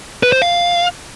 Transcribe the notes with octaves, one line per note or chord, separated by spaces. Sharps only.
B4
C5
F5